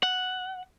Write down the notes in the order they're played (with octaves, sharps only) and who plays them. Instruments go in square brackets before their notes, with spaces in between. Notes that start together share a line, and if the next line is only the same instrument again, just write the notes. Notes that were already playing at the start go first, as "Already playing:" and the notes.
[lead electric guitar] F#5